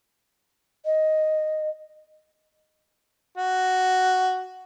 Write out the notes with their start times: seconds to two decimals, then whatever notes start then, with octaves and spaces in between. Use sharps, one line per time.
0.85 D#5
3.38 F#4